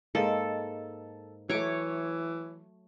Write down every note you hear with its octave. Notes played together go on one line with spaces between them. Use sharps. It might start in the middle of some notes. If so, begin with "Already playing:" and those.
G#2 A#3 A4 D#5
E3 F#3 A3 C#5 D6